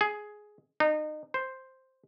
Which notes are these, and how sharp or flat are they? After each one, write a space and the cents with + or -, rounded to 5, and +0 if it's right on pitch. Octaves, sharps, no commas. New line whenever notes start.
G#4 +10
D#4 -30
C5 +0